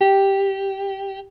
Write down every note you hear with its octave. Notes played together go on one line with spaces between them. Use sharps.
G4